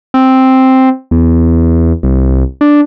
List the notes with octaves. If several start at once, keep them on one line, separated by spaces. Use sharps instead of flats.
C4
E2
C2
D4